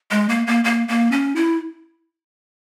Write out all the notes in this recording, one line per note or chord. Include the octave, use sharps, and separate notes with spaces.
G#3
A#3
A#3
A#3
A#3
C#4
E4